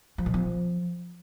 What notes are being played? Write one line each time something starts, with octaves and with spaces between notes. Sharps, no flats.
F3
B2
F3